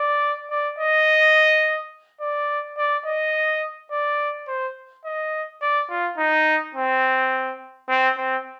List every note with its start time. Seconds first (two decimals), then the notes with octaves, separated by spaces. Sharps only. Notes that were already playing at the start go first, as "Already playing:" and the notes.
Already playing: D5
0.50 D5
0.79 D#5
2.21 D5
2.78 D5
3.06 D#5
3.91 D5
4.48 C5
5.05 D#5
5.62 D5
5.90 F4
6.18 D#4
6.75 C4
7.89 C4
8.17 C4